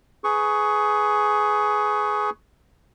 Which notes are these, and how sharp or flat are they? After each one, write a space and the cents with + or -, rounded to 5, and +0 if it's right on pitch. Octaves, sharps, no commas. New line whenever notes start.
G#4 +15 B4 +20 C#6 +0